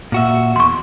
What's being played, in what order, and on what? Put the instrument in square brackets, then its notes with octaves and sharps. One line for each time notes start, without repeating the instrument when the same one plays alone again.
[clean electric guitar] A#2 F#4 E5
[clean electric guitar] E2 [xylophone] C6 C#6